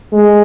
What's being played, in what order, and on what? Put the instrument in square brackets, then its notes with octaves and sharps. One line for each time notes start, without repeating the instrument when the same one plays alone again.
[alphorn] G#3